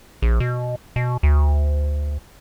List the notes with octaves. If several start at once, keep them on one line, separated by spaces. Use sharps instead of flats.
A#1
B2
B2
D2